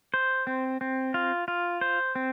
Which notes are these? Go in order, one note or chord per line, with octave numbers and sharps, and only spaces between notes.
C5
C4
C4
F4
F4
C5
C4